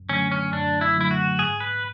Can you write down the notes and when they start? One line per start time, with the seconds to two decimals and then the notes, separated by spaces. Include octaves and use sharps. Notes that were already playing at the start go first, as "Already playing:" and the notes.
Already playing: F#2
0.09 D3 F#3 A3 C#4
0.32 C#4
0.53 F#2 D4
0.81 E4
0.96 D3 F#3 A3 E4
1.11 F#4
1.39 G#2 G#4
1.60 B4